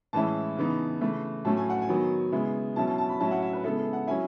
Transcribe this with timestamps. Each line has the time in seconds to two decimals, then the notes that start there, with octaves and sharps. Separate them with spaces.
0.13 A2 E3 G#3 C#4 E4 A5
0.57 C#3 E3 B3 D#4
1.01 C#3 E3 A3
1.45 A2 F#3 A3 C#4 A5
1.57 G#5
1.70 F#5
1.82 G#5
1.89 D#3 F#3 B3 D#4
2.32 C#3 G#3 B3 E4
2.76 B2 F#3 C#4 E4 A5
2.87 A5
2.98 A5
3.09 B5
3.20 A2 F#3 C#4 E4 A5
3.27 E5
3.31 F#5
3.42 E5
3.53 B4
3.64 C#3 G#3 B3 E4 A4
3.78 A4
3.93 F#5
4.07 F#3 C#4 E4 G#5